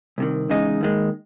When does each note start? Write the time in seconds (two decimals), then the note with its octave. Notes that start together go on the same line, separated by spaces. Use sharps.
0.18 C2 C3 D#3
0.50 E2 C#3 G#3 D#4
0.81 D#2 D#3 G#3